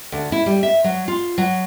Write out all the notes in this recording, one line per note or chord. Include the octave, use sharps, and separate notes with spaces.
D2
E4
G3
E5
F#3
F4
F#3